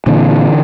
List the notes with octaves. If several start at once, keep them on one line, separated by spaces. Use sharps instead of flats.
A#2 D3 E3